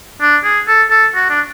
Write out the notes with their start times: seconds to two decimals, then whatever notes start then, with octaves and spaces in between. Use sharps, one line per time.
0.21 D4
0.44 G#4
0.67 A4
0.90 A4
1.15 F#4
1.30 D4